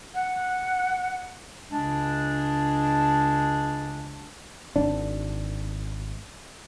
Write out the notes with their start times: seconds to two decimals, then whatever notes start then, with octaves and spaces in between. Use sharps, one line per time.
0.14 F#5
1.71 C#2 C#3 G#3 D4
4.76 G#1 D4